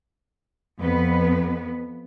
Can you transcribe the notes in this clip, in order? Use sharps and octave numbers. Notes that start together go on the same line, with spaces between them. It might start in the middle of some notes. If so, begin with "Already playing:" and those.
F2 B3 B4